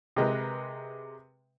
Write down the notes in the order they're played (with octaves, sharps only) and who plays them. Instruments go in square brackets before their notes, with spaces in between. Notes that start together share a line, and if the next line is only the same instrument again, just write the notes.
[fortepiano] C3 G#3 A#4 B4